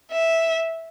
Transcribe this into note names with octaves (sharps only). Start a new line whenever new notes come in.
E5